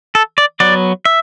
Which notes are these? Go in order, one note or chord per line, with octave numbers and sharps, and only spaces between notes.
A4
D5
F#3 B3 D5
E5